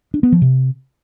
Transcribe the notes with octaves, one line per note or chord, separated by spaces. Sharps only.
D4
B3
F3
C3